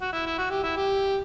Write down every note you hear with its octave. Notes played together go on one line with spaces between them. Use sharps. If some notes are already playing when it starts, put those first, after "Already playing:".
F#4
E4
E4
F#4
G4
E4
G4